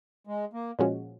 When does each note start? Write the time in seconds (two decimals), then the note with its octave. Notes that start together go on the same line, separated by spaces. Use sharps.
0.27 G#3
0.53 A#3
0.79 A#2 F3 G#3 C#4 F#4